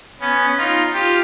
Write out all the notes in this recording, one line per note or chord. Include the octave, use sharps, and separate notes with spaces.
B3 C#4
D#4 F4
F4 G4